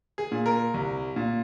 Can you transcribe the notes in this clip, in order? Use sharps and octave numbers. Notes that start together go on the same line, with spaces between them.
G#4
A#2
A#4
C2
A#2